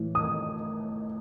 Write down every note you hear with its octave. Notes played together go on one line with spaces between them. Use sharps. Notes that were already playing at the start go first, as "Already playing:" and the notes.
Already playing: A2 E3
D#6